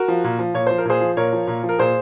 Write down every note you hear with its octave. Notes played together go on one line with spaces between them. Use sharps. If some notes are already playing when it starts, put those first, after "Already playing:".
Already playing: F#4 A#4
F3
A#2
F3
A#2 C#5
F3 C5
A#4
A#2 G#4 C5
F3
A#2 A#4 C#5
F3
A#2
F3
A#4
A#2 G#4 C5